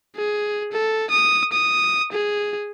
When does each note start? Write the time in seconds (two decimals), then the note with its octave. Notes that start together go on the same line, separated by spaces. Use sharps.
0.16 G#4
0.72 A4
1.10 D#6
1.52 D#6
2.13 G#4